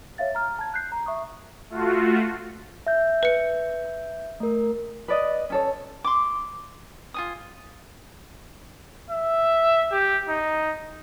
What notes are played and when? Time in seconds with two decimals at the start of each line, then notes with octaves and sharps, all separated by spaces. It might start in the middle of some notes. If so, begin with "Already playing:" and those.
0.18 C#5 E5 F5 A6
0.35 A#5 F6
0.59 A5 G#6
0.74 F#6 G6 C7
0.92 A#5
1.06 E5 C#6 D#6
1.70 A3 F4 F#4
2.87 E5 G6
3.23 B4 C#7
4.40 A3 A#4
5.08 B4 D5 D#5
5.50 C#4 A4 C#5
6.04 C6 D6
7.14 F4 G#5 D#6
9.10 E5
9.92 G4
10.28 D#4